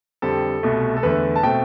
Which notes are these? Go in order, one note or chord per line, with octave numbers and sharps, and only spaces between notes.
F2 D3 G3 C4 A4
C2 B2 A3
A4
E2 D3 A3 B4
A5
B2 A3 C4 G5